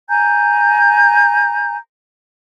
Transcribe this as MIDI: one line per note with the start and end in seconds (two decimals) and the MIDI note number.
0.09 1.76 80
0.09 1.76 82
0.09 1.76 91